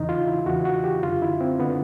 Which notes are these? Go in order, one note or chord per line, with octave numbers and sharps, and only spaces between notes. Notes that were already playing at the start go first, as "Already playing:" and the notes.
Already playing: E2 C#3 E3 D#4
F4
E4
E2 C#3 E3 F#4
F#4
G4
F#2 D3 F4
E4
C4
D3 B3